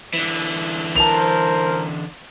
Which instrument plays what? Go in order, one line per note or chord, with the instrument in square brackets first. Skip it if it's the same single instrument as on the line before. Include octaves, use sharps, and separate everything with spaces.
[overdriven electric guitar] D3 E3
[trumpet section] A#4 C5 [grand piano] A5 F7